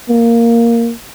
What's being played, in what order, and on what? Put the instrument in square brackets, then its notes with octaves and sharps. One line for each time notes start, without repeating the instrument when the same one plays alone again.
[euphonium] A#3